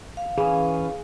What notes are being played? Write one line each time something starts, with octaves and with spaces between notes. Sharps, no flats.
F5
E3 C#4 G#4